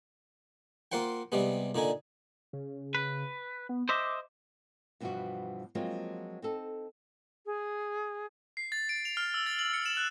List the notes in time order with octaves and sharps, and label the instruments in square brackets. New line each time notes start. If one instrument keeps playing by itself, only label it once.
[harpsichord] A#3 F4 C5 F#5 G5
C3 G3 G#3 B3
A#2 D3 D#4 G#5
[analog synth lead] C#3
[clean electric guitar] B4
[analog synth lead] B3
[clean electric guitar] C5 D#5 E5 [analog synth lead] D6
[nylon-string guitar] G2 B2 E3 F3 G3 F#4
F3 F#3 G#3 A#3 C4 F4
C4 D#4 A4
[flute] G#4
[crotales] C7
A6
D7
F7
F6
E6
A6
F#7
C#7
E7
F#6